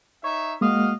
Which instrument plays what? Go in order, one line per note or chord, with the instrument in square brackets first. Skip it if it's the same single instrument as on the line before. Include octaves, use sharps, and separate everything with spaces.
[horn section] D#4 C#5 E5
[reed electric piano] G#3 A#3 [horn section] F#4 D#5 F5